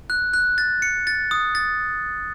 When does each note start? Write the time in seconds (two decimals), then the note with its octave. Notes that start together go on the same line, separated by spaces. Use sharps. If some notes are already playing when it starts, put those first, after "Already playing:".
0.10 F#6
0.34 F#6
0.58 A6
0.82 C#7
1.07 A6
1.31 D#6
1.55 A6